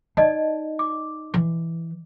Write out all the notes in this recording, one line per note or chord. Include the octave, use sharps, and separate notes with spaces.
D#4 D5 D#5 A5
D6
E3